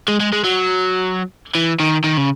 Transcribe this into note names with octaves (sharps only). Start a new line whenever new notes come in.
G#3
G#3
G#3
F#3
E3
D#3
D#3
C#3